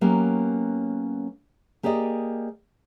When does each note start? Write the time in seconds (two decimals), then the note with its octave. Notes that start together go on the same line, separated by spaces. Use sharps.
0.01 F#3 A#3 B3 C#4 G4
1.83 A#3 G4 G#4 D5 D#5